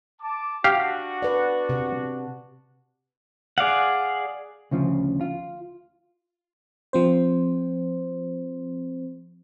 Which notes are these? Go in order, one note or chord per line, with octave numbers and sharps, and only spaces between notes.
A5 D6
D4 F#4 G4 F5
B4 D5
C3
G#4 D5 F5 F#5
D2 C#3 F3
F4
F3 C4 C5